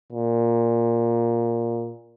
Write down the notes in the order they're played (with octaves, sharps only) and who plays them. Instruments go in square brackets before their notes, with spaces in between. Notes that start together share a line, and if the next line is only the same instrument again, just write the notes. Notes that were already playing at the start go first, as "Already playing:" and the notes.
[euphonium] A#2